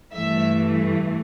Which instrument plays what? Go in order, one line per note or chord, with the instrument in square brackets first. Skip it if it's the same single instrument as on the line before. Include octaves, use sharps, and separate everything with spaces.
[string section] G2 E3 A3 E5